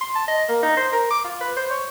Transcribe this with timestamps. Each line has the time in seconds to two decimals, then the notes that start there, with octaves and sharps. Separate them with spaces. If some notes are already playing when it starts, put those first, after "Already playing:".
0.01 C6
0.15 A5
0.28 D#5
0.49 A#3
0.63 D#4
0.77 C5
0.92 A#4
1.11 D6
1.24 F4
1.41 B4
1.57 C5
1.71 C#5